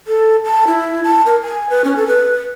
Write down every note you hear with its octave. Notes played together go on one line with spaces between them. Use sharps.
A4
A5
E4
A5
A#4
G#5
B4
C#4
A4
B4